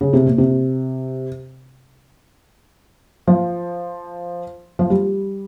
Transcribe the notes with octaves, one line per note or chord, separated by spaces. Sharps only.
C#3
C3
A#2
C3
F3
F3
G3